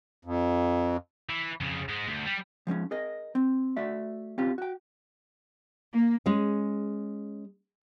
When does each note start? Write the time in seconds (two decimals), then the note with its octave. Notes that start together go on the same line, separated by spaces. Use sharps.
0.25 F2
1.29 E3
1.61 F2 C#3
1.89 G#2 G#3
2.08 D2
2.26 G3
2.67 F3 G#3 C4 C#4
2.91 G#4 A#4 D#5
3.35 C4
3.77 A3 F#4 D5 E5
4.38 C4 C#4 F4 G4
4.58 F#4 G5
5.93 A#3
6.26 G#3 C#4